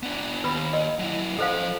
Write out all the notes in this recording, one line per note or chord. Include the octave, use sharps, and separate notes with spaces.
B3 D4
D#2 B4 B5
D#5
F#3 E4
F3 A4 C5 D#5 F5